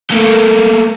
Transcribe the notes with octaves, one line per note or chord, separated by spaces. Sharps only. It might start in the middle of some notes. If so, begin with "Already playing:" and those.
A3 A#3